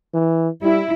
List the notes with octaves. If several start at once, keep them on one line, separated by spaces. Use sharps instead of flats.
E3
G3 E4